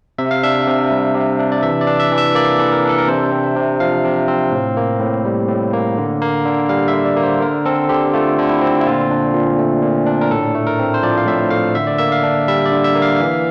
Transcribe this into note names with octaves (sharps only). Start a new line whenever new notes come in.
C3 E5
F5
D4 E5
C3
G3
C3
D4
D5
E3 E5
D5
D4
E5
E3
E5
A#3 D5
E3 A4
A#4
D4
A4
A#4
C3 C5
C4
E5
C3
F3 F5
C3
C4
A2
A#3
A2
G3
A2
A#3
D3
A#3
D3
G3 F5
E5
D3
D5
A#3
C5
D3 A#4
C4 A4
D3 G4
A3 F4
D3
E4
C4
E4
A#2 F4
D4
A#2
A3
A#2
D4
A#4
A2 A4
A3
A#4
C4
C5
F3 D5
F5
A2 E5
A3 F5
D3 E5
D5
A#3 E5
F5
D4
G3 E5
D5
D3
E5
A#3
F5
E3 F5